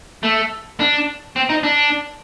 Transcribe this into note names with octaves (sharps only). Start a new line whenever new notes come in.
A3
D4
C4
D#4
D4